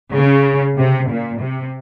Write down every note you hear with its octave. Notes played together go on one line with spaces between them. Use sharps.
C#3
C3
A#2
C3